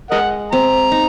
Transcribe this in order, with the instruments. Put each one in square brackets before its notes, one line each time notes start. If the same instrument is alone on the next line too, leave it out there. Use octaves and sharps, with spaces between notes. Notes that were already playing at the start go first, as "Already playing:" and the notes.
[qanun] G#3 [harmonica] A#4 D#5 F#5
[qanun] C4 [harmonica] A#5
[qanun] D#4